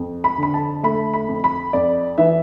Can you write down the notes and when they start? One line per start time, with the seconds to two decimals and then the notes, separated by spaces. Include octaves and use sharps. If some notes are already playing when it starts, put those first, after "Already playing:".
Already playing: F2
0.24 B5
0.38 D3 B5
0.54 A5
0.83 A3 B5
1.14 B5
1.28 F2
1.44 B5
1.73 F2 D5
2.18 E3 E5